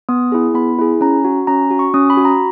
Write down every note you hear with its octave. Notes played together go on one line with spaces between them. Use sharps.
B3 D#6
E4 G#4
B3 B5
E4 G#4
C#4 A#5
F#4
C#4 A#5
F#4
C#6
C#4 D#6
B5
F#4
A#5